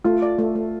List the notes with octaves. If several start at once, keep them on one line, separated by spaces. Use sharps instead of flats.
A3 F4
D5
A3
A3